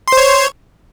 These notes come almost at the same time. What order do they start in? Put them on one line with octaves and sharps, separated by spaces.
C6 C5 C#5